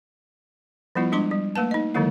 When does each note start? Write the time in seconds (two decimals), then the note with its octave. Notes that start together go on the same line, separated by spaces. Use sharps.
0.95 F3 G3 B3 E4 F4
1.12 G3 G#3 D4 C6 D6
1.31 G3
1.56 A3 A#3 B4 A5
1.71 D#4 D#5
1.94 D3 D#3 F#3 G#3 A#3 E4